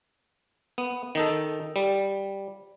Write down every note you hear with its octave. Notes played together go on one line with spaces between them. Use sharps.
B3
D#3 D#4 A4
G3